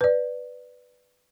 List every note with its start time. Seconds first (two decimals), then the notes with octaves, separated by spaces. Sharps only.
0.01 B4 D5